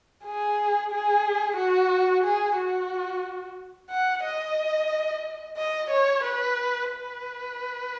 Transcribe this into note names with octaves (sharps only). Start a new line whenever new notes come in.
G#4
G#4
F#4
G#4
F#4
F#5
D#5
D#5
C#5
B4
B4